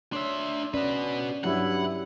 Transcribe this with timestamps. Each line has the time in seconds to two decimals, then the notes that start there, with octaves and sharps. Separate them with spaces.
0.12 D4 C#5 E5 C6
0.74 C#4 F#4 B4 D5
1.44 G2 F#3 G3 E4 F#5